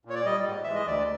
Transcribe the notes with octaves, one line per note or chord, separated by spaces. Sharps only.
A#2 C#5
D5
G3 D#5
G#2
E3 G#3 E5
D#5
D2 D5